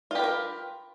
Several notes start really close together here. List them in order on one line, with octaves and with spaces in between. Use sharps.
F4 G4 B4 A#4